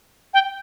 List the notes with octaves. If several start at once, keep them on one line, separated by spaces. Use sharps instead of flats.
G5